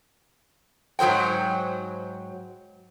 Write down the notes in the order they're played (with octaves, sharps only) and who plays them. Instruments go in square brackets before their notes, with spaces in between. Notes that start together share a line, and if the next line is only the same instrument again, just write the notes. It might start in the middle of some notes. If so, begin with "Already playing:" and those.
[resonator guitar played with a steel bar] G#2 F#3 A4 C5 G5